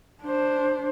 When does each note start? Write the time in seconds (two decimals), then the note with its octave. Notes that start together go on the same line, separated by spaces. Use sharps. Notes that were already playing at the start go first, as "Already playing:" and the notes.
0.24 D4 C5